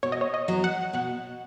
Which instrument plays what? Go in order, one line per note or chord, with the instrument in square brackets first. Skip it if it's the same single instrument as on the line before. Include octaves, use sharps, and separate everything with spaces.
[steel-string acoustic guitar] B2 [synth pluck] C#5
[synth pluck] D#5
C#5
D#5
[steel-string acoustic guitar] F#3 B3
[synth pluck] F#5
[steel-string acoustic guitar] B2 [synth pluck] F#5